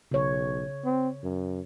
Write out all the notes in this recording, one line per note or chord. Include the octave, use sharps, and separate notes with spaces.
B1 C#3 C#5
C4
F#2